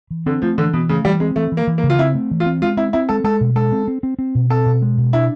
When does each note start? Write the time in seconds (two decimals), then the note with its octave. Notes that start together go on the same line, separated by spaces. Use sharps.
0.11 E3
0.26 D3 C4
0.42 F3 A3
0.58 D3 E3
0.73 B2 E3
0.89 C#3 A3
1.05 E3 G3
1.20 G#3 C4
1.36 E3 A3
1.52 E3
1.57 A#3
1.67 E3
1.78 A#3
1.83 C#3
1.90 F4
1.99 C4 E4
2.15 A3
2.31 E3
2.40 F4
2.46 C4
2.62 G#3 F4
2.77 C4 E4
2.93 C4 E4
3.09 G#3 A4
3.24 G#3 A4
3.41 B2
3.55 G#3 A4
3.72 C4
3.88 C4
4.03 C4
4.19 C4
4.35 B2
4.50 C4 A4
4.66 B2
4.82 G#3
4.98 B2
5.13 D4 E4